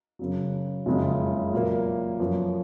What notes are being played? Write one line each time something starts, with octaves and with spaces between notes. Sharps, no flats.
F#2 C#3 F#3
F#1 F2 C#3 G#3
A#2 F#3 A#3
F#2 F3 B3